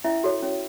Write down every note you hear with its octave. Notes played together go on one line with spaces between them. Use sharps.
C#4 E4 E5
F#4 A4 C#5
C#4